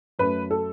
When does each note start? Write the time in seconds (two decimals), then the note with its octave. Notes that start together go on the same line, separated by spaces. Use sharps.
0.19 F#2 F#3 A3 B4
0.51 A4